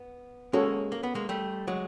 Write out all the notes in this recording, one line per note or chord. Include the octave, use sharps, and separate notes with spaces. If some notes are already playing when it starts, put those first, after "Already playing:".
Already playing: B3
G#3 A#3 C#4 F#4 A4 C#5
A#3
B3
G#3 A#3
G3 A3
F#3 G#3